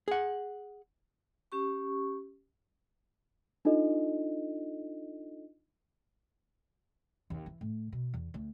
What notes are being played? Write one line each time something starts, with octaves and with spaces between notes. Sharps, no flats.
G#4 F#5
C#4 G4 C#6
D4 D#4 F4 A4 D#5
D#2
E3
A2
B2
E2
D2